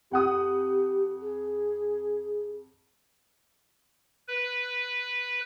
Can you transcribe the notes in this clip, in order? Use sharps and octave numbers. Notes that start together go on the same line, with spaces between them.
F2 G4 F#5 D#6
G#4
B4